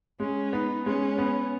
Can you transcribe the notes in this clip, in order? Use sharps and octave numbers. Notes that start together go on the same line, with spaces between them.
G#3 C#4
B3 D#4
G#3 C#4
B3